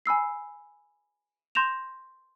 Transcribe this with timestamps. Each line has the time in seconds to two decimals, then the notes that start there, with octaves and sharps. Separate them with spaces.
0.06 G#5 B5 E6 C7
1.55 C6 G6 A#6 E7 F7